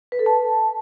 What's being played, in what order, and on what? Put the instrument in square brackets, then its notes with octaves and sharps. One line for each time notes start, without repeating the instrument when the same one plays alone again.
[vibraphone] B4
A4
A5